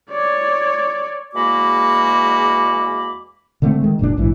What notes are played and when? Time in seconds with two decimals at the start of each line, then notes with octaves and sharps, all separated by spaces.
0.11 C#5 D5
1.34 E2 G#3 A#3 F#4 B5 D6
3.62 D3 G#3 A3 C4
3.81 D#3 G#3
3.99 F#1 A#2 C#4 D4
4.17 A#1 G#2 E3